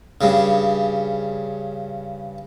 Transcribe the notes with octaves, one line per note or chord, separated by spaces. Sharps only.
G2 C#3